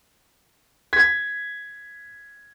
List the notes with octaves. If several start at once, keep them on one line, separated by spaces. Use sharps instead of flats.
G#6 B6